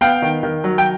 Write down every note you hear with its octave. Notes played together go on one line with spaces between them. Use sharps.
B3 F5 G5
D#3
D#3
F#3
G5